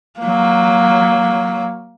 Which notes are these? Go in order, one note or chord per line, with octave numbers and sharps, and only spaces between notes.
F#3 A#3